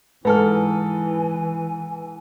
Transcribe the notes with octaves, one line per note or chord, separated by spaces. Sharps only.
G#2 E3 A4 B4 G#5 F6